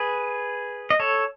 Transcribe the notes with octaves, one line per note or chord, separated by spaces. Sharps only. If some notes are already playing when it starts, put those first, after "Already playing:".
Already playing: G#4 B4
D#5
A4 C#5